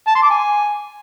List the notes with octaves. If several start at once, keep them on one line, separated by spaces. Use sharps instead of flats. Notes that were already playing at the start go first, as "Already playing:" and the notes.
A5
C6
D6
G#5